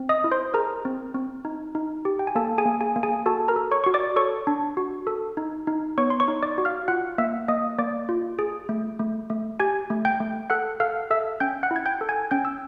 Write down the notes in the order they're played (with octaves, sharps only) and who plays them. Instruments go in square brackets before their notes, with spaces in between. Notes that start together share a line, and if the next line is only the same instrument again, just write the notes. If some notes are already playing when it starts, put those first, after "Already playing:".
Already playing: [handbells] C4
D#5 D#6
E4
C5 C6
G#4 A#4 A#5
C4
C4
D#4
D#4
G4
G5
G#5
A#3 A4 A5
G#4 G#5
A#3
G#4 G#5
A#3
G#4 G#5
F#4 A4 A5
A#4 A#5
A4
C#5 C#6
F#4 C#6
D5 D6
A4 C#5 C#6
D4
F#4
A4
D#4
D#4
B3 C#5 C#6
C6
C#5 C#6
D#4
D5 D6
F#4
F5 F6
F4 F#5 F#6
A#3 E5 E6
A#3 D#5 D#6
A#3 D5 D6
F4
G#4
A3
A3
A3
G4 G#5 G#6
A3
G5 G6
A3
A4 F#5 F#6
A4 F5 F6
A4 E5 E6
C#4 G5 G6
F#5 F#6
E4
G#6
G5 G6
A4
G#5 G#6
C#4 G5 G6
E6